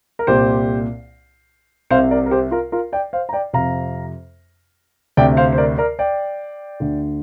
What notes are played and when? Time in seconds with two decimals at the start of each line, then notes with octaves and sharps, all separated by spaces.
0.19 A#4
0.27 C2 A#2 G4 C5
1.90 C2 C3 C5 F5
2.11 A#4 D5
2.26 A#4
2.31 G4 C5
2.51 F4 A#4
2.72 F4 A#4
2.92 D5 G5
3.13 C5 F5
3.29 A#5
3.33 D5 G5
3.53 F2 C3 F5 A#5
5.17 D2 C3 D5 G5
5.37 C5 F5
5.52 C5
5.58 A#4 D5
5.78 A#4 D5
5.99 D5 G5
6.80 D2 D3